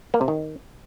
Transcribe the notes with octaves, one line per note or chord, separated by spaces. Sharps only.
A#3
C3
D#3